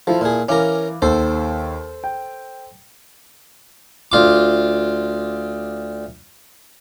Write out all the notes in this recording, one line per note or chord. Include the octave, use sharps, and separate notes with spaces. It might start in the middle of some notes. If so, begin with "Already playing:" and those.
F3 E4 F4 A4
A#2 G#4
E3 C#4 A#4 F5 D6
D#2 A4 C5
G5
D2 F4 D6